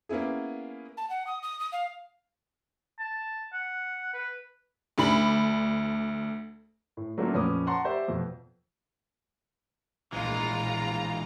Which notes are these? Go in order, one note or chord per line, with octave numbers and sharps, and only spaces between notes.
A#3 B3 C#4 E4 G#4
A5
F#5
D#6
D#6
D#6
F5
A5
F#5
B4
D2 D4 B5 F#7
A2
F#3 A3 A#3 C#4 D4 F4
F2 A#2 C#4 B4 D6 D#6
F#5 A5 A#5 C6 C#6
G4 C5 D5 E5
F2 B2
A#1 E3 G#3 F4 A#5